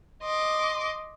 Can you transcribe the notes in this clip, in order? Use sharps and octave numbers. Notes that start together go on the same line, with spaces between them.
D#5 C6 D6